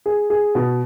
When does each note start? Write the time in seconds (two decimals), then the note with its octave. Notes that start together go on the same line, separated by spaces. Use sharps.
0.06 G#4
0.30 G#4
0.55 B2